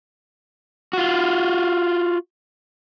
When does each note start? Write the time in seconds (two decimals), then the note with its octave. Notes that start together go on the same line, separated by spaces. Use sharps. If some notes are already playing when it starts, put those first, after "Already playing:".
0.93 F4 F#4